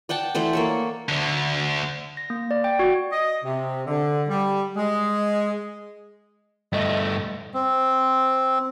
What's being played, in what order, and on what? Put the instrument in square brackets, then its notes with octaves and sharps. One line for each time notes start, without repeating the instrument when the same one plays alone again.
[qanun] D5 F#5 G5 A5
E3 A3 C5 D5
A#3 A4 C#5
[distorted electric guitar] D2 D3
[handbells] A#6
A#3
D5
G5
F#4
[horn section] D#5
C3
D3
G3
G#3
[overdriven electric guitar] G2 A3 [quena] D#5
[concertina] C4